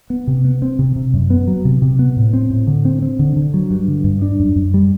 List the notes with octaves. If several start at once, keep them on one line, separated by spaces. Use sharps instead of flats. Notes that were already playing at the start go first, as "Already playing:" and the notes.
B3
C3
B3
C4
C3
C3
F#2
B3
F#3
C3
C3
B3
A2
C4
A2
D3
C4
C4
D3
D3
F#3
G2
D3
G2
D4
F#2
F#2
G3